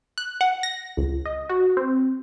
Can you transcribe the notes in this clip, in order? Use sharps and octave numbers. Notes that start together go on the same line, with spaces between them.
F#6
F#5
A#6
C#2
D#5
F#4
C4